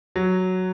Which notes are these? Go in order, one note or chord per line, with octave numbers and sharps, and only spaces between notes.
F#3